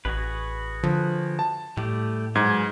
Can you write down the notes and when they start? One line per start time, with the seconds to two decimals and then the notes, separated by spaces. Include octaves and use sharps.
0.05 A1 F#4 G#4 B4
0.83 D3 F3
1.39 A5
1.77 A2 G3 A3 G4
2.35 G#2 F#3 G#3 B3 G#6